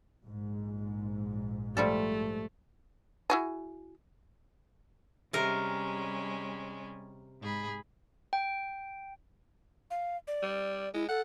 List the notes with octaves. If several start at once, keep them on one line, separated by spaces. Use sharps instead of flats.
A#1 G#2
F3 G3 A3 A4
E4 F#4 G#4
C3 G3 G#3 C#4 A#4
G#2 G#4 B5
G5
F5
D5
G3
G#3 E4
A4 F#5